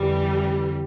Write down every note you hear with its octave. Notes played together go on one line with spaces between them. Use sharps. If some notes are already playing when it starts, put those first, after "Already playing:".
Already playing: F2 D3 E3 G3